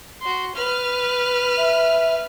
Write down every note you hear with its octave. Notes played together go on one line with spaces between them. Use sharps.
F#4 C6
B4 F6
E5